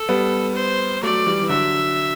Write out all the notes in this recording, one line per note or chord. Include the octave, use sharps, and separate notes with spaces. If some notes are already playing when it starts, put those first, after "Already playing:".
Already playing: A4
G3 B3
C5
F#3 A3 D5
E3 G3
E3
D3 F#3 E5